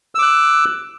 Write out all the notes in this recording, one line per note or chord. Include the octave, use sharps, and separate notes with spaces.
D6 E6 F#6